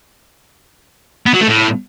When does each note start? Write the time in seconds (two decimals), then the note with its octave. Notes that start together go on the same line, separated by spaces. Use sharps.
1.26 B3
1.33 F#3
1.41 A3
1.48 A2